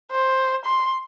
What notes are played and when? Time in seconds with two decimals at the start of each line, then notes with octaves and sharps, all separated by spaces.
0.11 C5
0.65 C6